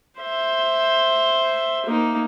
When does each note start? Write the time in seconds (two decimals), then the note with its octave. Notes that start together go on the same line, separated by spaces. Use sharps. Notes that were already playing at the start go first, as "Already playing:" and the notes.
0.19 C5 E5
1.86 A#3 D#4